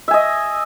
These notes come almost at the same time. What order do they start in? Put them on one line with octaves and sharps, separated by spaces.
E5 G#5 D#5